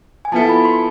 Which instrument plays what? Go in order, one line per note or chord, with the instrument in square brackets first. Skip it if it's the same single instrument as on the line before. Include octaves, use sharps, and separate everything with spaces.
[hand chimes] G#5
[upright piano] F3 B3 E4 A4 [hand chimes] A5
[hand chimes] B5
C6